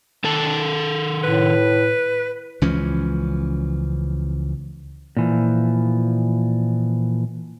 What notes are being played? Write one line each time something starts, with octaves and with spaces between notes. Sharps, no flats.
D#3 A4 A5
A2 B4
C#2 E3 F3 C#4
A#2 E3 F3